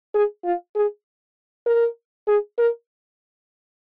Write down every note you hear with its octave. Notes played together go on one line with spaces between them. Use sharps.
G#4
F4
G#4
A#4
G#4
A#4